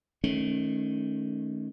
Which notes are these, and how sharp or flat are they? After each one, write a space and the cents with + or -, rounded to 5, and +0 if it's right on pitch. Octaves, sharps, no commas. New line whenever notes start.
D#3 -5 A3 -30 C#4 -25